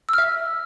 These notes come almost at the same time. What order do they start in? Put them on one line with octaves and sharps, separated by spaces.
E6 F6 E5